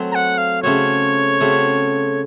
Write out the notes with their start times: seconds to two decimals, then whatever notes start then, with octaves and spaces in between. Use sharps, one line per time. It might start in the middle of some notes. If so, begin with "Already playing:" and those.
Already playing: F#3 A3 C4 F#4
0.11 A#5
0.15 F#5
0.38 F5
0.63 C#3 A3 C4 F#4 C#5
1.40 C#3 A3 C4 F#4